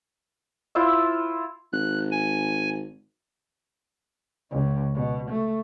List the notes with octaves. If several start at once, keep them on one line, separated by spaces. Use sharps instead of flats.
E4 F4 C5 E6
G#1 F#6
G#5
C#2
B2
A3